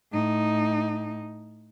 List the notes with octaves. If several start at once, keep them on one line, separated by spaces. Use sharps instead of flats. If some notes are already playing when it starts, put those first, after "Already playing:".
A2 D#4